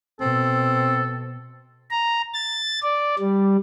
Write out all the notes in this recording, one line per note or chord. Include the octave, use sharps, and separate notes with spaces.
B2 C4 A4
A#5
A6
D5
G3